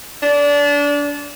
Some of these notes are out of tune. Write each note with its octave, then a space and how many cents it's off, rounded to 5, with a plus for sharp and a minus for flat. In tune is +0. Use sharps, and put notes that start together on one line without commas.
D4 -25